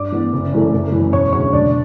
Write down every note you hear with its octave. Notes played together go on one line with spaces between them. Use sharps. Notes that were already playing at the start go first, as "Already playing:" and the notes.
Already playing: G2 D5 D6
E3 B3
F#1
F#2 E3 A3
F#1
F#2 E3
E1 C#5 C#6
D2 C#3 F#3 C#5 C#6
E1 D4 D5